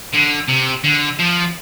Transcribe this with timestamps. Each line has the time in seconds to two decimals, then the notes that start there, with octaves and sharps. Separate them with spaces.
0.14 D3
0.49 C3
0.84 D3
1.19 F3